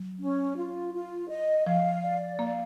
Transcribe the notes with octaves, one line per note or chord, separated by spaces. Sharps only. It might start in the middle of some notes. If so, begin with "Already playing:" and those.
Already playing: F#3
C#4
F4
F4
D#5
F3 F5
D5
A#3 F5